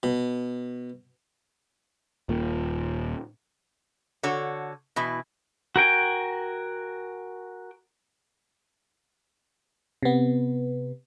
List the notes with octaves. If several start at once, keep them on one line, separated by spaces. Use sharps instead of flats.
B2
D#1 A#2
D3 F#4 A4 C#5
B2 E3 E4
F#4 A#4 G5 G#5
C3 B3